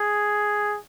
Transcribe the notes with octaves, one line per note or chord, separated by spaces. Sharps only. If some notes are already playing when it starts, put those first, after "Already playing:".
Already playing: G#4